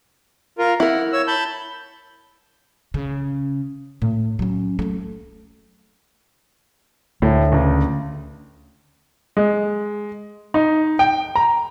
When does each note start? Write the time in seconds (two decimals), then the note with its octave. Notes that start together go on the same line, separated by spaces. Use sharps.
0.58 F4 A#4
0.80 E4 A#4 F#5
1.13 C#5 E6
1.27 A5 B5 G6
2.94 C#3
4.02 A2
4.39 F#3 C#4
4.79 A3 A#3
7.22 D2 A2
7.52 C#2 C#3
9.37 G#3
10.54 D#4
10.99 G5
11.35 A#5